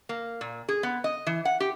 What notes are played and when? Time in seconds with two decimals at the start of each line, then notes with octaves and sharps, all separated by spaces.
0.09 A#3
0.41 A#2
0.68 G#4
0.83 B3
1.04 D#5
1.27 E3
1.45 F#5
1.60 G4